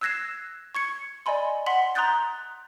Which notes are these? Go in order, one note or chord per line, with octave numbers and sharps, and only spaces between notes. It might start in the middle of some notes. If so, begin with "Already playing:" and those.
E6 F#6 G#6 A#6 C7 E7
C#6 G#6 C#7
D5 D#5 G#5 B5 C6
F#5 C6 B6 F#7
A#5 C6 D#6 F#6 G6 A6